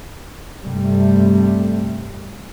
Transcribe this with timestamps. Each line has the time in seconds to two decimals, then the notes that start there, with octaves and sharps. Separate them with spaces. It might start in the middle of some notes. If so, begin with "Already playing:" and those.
0.64 G2 C3 G3 A3